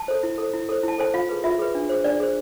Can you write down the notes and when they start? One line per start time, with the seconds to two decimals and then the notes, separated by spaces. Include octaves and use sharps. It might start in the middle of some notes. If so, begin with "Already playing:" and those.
Already playing: A5
0.08 A4 C5
0.23 E4
0.38 A4 C5
0.53 E4
0.69 A4 C5
0.83 E4 A5
0.98 A4 C5 G#5
1.14 F4 F5
1.29 G#4 B4
1.44 F4 E5
1.59 G#4 B4
1.75 D4
1.89 G#4 C5
2.04 D4 D5
2.20 G#4 C5